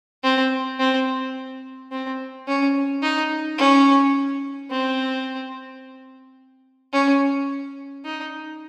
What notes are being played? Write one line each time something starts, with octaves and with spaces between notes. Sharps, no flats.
C4
C4
C4
C#4
D#4
C#4
C4
C#4
D#4